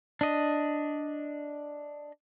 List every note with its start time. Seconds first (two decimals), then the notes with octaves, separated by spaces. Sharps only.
0.21 D4 D#5